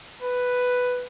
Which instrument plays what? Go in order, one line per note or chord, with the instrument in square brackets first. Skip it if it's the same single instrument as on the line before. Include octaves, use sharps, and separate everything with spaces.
[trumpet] B4